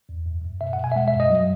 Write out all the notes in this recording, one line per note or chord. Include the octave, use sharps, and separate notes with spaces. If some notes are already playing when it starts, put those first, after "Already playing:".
E2
F#2
F#2
B2 E5
F#5
B2
G#5
E5
G#3 F#5
E5
F#2
D#5
F#3